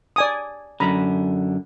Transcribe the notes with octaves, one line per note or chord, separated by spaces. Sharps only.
D5 G#5 D#6
F#2 D3 A#5 B5